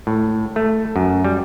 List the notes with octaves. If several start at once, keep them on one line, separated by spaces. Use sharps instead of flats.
A2
A3
F#2
G3